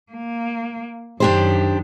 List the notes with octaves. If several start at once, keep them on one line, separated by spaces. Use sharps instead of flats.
A#3
F#2 D#3 D4 G4 C5